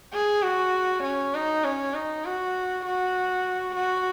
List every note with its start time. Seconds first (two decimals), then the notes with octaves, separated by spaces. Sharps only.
0.14 G#4
0.43 F#4
1.04 C#4
1.34 D#4
1.65 C#4
1.94 D#4
2.25 F#4
2.85 F#4
3.75 F#4